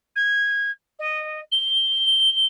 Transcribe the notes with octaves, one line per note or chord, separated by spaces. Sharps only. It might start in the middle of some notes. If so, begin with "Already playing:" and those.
G#6
D#5
G7